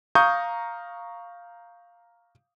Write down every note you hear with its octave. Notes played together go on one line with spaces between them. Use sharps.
F5 A#5 C#6 D#6 G6